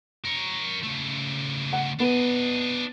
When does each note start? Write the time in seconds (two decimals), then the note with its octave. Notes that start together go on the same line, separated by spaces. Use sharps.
0.25 A#4 C#5
0.83 C#3 A3
1.73 F#5
2.00 B3 D4 D#5